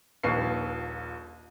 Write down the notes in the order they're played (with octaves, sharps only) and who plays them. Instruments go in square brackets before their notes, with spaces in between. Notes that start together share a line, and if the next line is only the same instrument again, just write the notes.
[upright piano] D#1 A#1 D#2 B4 C#6 C7